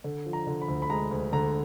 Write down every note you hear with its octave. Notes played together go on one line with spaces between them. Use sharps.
D3
F3
A#5
D3
B5
D2
B5
G#3 A#5
D2
D3 A#5